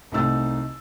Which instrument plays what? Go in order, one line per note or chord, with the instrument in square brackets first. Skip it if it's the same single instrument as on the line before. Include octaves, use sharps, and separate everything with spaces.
[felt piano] C2 A3 D#4 E6 A6